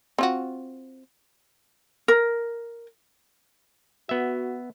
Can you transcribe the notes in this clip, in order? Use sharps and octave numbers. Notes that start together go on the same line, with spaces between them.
C4 F4 F#4
A#4
B3 F#4 E5